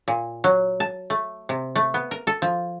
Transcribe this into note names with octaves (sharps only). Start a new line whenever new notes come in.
A#2
F#3
A5
A3
C3
A3
B3
A#4
A4
F3